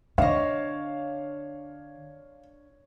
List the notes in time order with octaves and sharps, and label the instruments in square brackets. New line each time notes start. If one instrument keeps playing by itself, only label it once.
[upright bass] D3 [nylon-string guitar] D4 D#5 [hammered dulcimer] C#5 [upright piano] F5